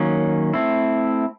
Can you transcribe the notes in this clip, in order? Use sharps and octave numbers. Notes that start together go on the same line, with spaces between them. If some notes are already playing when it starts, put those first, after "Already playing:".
Already playing: D#3 F#3 A#3 C#4
A3 C4 E4